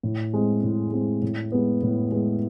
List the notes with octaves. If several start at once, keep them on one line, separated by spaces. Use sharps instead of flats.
A2
G#3 C4
A2
G#3 C4
A2
G#3 B3
A2
G#3 B3